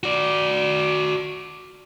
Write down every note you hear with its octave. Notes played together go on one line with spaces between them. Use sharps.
F#4 D5